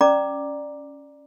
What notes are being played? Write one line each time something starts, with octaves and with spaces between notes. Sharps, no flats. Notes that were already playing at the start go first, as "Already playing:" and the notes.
C#4 D5 A#5 D6